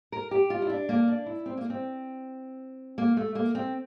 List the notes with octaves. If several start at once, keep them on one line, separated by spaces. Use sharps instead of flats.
A#4
G4
F4
E4
D4
A#3
D4
E4
C4
A#3
C4
A#3
A3
A#3
C4